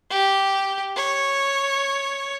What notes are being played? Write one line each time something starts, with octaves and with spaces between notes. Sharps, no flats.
G4
C#5